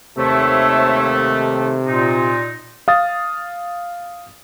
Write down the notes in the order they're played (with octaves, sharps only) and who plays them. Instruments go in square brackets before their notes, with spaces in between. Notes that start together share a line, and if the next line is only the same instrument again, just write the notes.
[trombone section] D#2 A3 [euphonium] C3 [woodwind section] C5 C#5 E5
[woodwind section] A#2 D#4
[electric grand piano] F5 D#6 A6